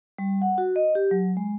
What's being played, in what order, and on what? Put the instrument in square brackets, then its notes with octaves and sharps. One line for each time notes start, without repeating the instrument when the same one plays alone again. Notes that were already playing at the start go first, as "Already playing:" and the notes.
[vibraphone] G3
F#5
F#4
D#5
G4
F#3
G#3